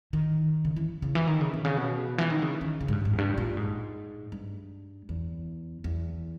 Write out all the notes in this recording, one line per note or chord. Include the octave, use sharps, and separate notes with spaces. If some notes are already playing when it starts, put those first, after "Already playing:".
D#3
C#3
E3
C#3
E3
D#3
C#3
B2
C#3
B2
E3
D#3
C#3
D#3
C#3
G#2
G2
G#2
E2
G2
A#2
G#2
G2
E2
E2